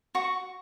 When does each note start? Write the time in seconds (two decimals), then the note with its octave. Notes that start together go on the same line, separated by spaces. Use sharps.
0.15 F#4 C#6